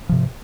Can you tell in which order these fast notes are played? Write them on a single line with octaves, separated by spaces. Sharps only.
F3 C3 G#2